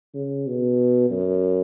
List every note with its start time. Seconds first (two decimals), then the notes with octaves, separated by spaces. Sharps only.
0.14 C#3
0.47 B2
1.10 F#2